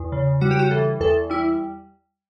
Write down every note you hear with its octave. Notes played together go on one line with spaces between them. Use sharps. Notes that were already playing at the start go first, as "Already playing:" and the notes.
Already playing: E2
C#3
G3 F#4
G4
F#4
E3 A4
E2 A4
G3 E4